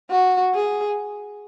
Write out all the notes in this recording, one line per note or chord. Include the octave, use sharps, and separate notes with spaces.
F#4
G#4